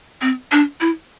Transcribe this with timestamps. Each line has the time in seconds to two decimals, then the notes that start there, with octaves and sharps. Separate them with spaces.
0.22 C4
0.52 D4
0.81 E4